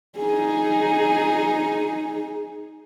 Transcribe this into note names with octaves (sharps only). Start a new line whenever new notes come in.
D#4 G#4